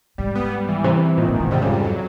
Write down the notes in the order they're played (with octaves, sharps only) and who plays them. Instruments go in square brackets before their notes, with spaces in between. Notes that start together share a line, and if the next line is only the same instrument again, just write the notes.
[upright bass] G#2 [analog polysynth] G3
[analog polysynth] B3
G3
E3
[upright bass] C3 [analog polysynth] E3
[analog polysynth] E3
[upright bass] A#2 [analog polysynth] D#3
[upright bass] A#2
[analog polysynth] G#2
[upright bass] B2
[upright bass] C3 [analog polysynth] G3
[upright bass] C#3
[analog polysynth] F2
[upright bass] C3
[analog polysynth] F#3